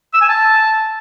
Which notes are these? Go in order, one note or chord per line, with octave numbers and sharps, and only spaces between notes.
E6
G#5
A5